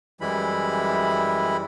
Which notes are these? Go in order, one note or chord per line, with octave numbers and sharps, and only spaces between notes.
F#2 E3 G3 G#3 E4 B5